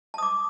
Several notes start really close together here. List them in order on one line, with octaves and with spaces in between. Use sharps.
A5 D#6 D6